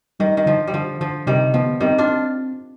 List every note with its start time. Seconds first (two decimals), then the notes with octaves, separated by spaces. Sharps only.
0.20 D#3 G3
0.37 D#3
0.46 D3 F3
0.68 G3
0.74 D3 F3
1.00 D3 F3
1.27 C3 D#3 G3
1.54 F3 B3
1.80 D#3 G3 C4
1.98 D4 F4
2.08 C4